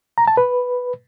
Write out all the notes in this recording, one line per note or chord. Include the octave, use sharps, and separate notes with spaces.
A#5
A5
B4